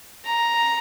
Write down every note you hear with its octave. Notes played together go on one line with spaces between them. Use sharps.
A#5